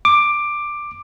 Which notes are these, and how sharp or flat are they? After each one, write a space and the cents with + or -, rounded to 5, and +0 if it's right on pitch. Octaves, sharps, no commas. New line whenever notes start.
D6 +10